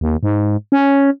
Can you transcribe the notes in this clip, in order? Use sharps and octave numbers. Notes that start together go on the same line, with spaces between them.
D#2
G#2
C#4